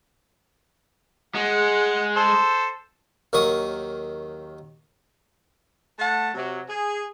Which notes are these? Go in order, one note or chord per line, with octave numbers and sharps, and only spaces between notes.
G#3 F#5
A4 C5
D#2 D#3 F#3 C#6 D#6
A3 F#5 A5
C3 F#3
G#4